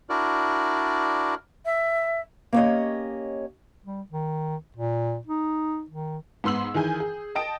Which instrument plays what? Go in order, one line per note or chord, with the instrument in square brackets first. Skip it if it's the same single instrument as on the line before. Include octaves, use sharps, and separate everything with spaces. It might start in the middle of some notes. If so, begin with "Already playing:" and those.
[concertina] D4 E4 F#4 A#4 D5
[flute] E5
[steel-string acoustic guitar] A#3 B3 C#4 G4 C#5 D#5
[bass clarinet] G3
D#3
A#2
D#4
D#3
[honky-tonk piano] G#2 B3 C6 E6 F#7
D#3 E3 G#4 G#5 G6
G#4
D#5 G5 A5 D#6 D7